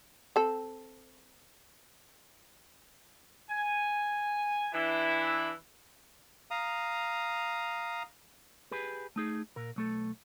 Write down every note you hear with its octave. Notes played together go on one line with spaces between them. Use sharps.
C4 A4
G#5
E3 D4 E4
F5 A#5 D#6
G4 G#4 B4
A3 D#4 G#4
A#2 A#4
B1 A3 A4